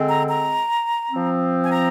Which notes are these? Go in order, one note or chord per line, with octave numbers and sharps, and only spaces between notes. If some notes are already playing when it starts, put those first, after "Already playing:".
Already playing: D3 G#3 C4
A#5
A#5
F3 C4
G#5
A#5